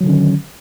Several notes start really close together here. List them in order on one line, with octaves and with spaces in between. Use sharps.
F#3 D#3 D3 C#4